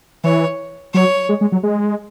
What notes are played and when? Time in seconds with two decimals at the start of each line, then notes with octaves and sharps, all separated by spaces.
0.24 E3 C#5
0.94 F#3 C#5
1.29 G#3
1.41 G#3
1.52 F#3
1.63 G#3